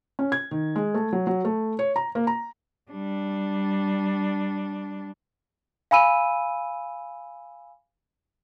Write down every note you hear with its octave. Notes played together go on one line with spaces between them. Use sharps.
C#4
G#6
D#3
G#3
A3
F#3
F#3
A3
C#5
A#5
A#3
A#5
G3 D4
F5 G#5 B5 E6 D#7